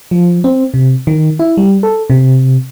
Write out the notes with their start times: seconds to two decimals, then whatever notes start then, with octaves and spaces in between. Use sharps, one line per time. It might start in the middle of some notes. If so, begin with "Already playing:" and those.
0.11 F3
0.44 C4
0.74 C3
1.07 D#3
1.39 E4
1.57 G3
1.83 A4
2.10 C3